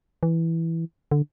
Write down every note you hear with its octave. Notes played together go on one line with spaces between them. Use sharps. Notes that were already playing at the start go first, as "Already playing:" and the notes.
E3
D3